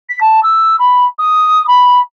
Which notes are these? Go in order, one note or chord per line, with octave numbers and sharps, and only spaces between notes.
B6
A5
E6
B5
D#6
B5